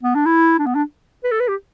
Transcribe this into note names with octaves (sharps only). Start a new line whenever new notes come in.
B3
D4
E4
D4
B3
D4
B4
A4
B4
G4